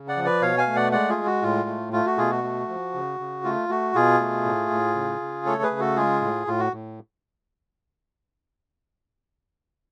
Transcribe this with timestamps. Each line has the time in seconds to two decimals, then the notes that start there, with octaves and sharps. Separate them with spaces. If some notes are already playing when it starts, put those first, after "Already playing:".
Already playing: C#3
0.08 D5 F#5
0.16 F3
0.24 B4 D5
0.42 B2 C#5 F5
0.58 F5 G#5
0.67 A3
0.76 D5 F#5
0.92 G#3 D5 F#5
1.09 F4 G#4
1.17 G#3
1.26 F#4
1.42 A2 F4
1.68 A3
1.93 A3 F4
2.06 F#4
2.18 B2 F4 G#4
2.31 F#4
2.44 A3
2.69 F3
2.94 C#3
3.20 C#3
3.44 A3 F4
3.69 A3 F#4
3.95 B2 F4 G#4
4.20 A3
4.45 A2
4.71 A2
4.96 C#3
5.21 C#3
5.46 A3 A4 C#5
5.63 G#4 B4
5.71 C#3
5.80 F#4 A4
5.96 G#3 F4 G#4
6.21 A2
6.47 A2 F4
6.59 F#4
6.72 A2